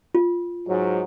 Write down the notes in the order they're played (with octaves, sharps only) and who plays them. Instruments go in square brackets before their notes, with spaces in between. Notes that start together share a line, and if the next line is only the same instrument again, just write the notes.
[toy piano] F4
[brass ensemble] G#2 F#3